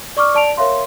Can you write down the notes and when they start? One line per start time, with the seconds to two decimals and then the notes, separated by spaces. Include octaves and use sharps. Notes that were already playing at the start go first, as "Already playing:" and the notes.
0.17 D5 C#6 D6 F6
0.35 D5 A5 D7 F7
0.57 A#4 C#5 E5 F5 C6